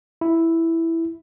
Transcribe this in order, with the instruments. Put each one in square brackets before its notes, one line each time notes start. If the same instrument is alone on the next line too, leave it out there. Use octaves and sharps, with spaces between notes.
[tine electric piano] E4